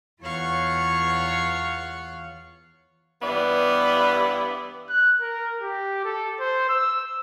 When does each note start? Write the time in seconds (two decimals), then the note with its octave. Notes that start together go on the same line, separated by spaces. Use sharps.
0.23 E2 F4 C#5 F5 F#5 C#6
3.22 G2 E3 B3 D5
4.90 F#6
5.21 A#4
5.62 G4
6.05 A4
6.40 C5
6.69 E6